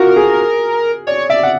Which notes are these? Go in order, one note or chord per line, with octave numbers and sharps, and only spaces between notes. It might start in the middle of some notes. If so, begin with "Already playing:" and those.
Already playing: F4 F#4 A#4
G#4
C#5 D5
D5 E5
F#5